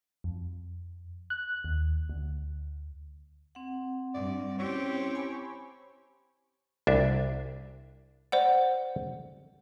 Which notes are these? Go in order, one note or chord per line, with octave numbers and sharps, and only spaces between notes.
F2
F#6
D#2
D2
C4 F#5
G2 D5
C4 C#4 E4 G4 C#5
G#5 B5 C#6
C2 D4 E5
C5 D5 F#5